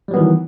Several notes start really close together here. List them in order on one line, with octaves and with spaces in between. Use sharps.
G3 F#3 B3 D#3 E3